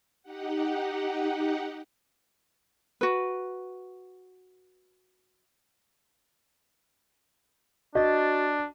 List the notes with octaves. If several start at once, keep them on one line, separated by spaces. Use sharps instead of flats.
D#4 G4 F#5
F#4 B4
D4 F#4 D#5 A6